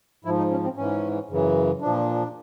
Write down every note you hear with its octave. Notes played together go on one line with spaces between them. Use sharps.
G#2 F3 E4
D#4
C#4
C4
G#2 E3 C#4
F#2 C#3 E3
A#2 F3 D4